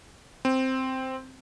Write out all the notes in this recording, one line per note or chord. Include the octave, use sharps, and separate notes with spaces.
C4